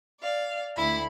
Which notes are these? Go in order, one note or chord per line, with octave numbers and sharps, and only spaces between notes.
D5 F5
D2 E4 B5